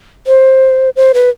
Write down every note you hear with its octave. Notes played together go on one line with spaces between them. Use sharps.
C5
C5
B4